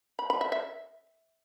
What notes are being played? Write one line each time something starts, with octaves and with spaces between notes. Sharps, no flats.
B5
B5
E5
E5